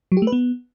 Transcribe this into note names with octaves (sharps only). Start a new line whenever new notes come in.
F#3
G4
A3
B4
B3